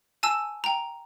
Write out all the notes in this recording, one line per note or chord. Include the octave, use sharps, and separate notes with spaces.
G#5 A5 E6
G5 A#5